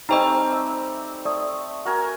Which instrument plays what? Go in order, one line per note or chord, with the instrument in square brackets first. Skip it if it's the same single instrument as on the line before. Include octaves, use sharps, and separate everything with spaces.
[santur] G3 A3 C4 [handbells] D#4 C5 D#5 [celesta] A#5 C#6
[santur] E5
[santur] A3 [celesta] D5 D#6
[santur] F#4 A#4 G#5